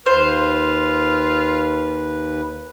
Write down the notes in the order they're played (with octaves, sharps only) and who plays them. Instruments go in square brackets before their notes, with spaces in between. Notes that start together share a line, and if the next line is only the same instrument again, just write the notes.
[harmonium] D#2 B4 [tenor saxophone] F4 [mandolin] C5